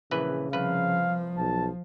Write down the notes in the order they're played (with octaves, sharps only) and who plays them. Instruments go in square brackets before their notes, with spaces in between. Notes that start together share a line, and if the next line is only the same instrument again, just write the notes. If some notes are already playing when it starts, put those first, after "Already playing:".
[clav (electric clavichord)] A#1 E3 B4 [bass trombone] C#3
[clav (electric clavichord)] C2 B4 [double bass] F3 [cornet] F5
[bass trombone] B1 [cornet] A5